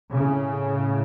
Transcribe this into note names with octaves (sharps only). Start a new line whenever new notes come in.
A2 C#3